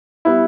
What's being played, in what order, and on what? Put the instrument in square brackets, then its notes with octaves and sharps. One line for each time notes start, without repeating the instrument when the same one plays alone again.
[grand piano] G3 B3 E4